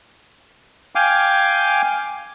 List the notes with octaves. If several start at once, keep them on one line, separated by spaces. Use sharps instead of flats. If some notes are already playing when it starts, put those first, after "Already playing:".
F5 G5 G#5 D6